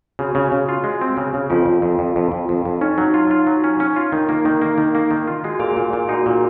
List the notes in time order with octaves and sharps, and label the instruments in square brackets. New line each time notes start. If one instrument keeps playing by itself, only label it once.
[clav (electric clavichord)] C#3 [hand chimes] F#4
[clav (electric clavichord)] C#3
C#3
F4
G#3
C4
C#3
C#3
[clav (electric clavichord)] F2 [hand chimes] F4
[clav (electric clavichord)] F2
F2
F2
F2
F2
F2
F2
[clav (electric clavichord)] C#4 [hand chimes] D#4
[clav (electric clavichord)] F#3
F4
F4
F#3
C#4
C#4
F4
[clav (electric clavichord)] D#3 [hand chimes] D#4
[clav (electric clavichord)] A#3
D#3
A#3
[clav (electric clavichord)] D#3 [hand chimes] D#4
[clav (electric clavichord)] A#3
D#3
F4
[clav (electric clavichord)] G#3 [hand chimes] F#4
[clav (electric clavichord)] A#2 [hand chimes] G#4
[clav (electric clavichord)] A#2 [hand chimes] G#4
[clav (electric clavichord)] A#2 [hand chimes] G#4
[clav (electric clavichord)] D#4 [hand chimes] F#4
[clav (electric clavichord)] A#2